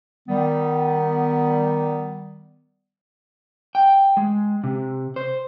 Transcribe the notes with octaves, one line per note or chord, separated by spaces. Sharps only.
D#3 G3 B3
G5
G#3
C3
C5